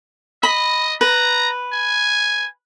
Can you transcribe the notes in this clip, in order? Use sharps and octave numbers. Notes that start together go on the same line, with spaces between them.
D#5 B5
B4 A#5
G#5